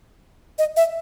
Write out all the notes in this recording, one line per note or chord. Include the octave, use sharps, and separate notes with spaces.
D#5
E5